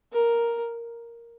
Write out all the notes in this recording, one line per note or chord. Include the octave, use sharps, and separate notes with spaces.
A#4